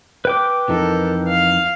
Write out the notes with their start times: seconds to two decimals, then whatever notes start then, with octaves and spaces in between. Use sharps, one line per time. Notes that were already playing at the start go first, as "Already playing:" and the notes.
0.25 B4 G5 D6
0.69 F2 E3 D#4 A4 A#4
1.28 F5